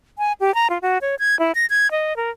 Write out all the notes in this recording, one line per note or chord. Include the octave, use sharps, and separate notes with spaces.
G#5
G4
A#5
F4
F#4
C#5
G#6
E4
A#6
G#6
D#5
A#4